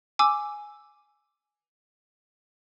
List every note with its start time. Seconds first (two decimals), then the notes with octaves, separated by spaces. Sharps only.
0.19 G#5 D6 E6